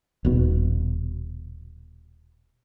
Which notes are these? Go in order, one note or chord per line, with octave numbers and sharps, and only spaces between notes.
D#1 B2